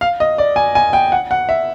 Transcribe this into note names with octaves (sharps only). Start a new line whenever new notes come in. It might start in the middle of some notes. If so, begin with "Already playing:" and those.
F5
D#5
D5
G#5
G#5
G5
F#5
F#5
E5